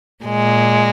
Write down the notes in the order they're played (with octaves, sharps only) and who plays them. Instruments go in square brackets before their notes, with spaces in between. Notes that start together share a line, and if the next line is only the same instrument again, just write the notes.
[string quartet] A#2 G#3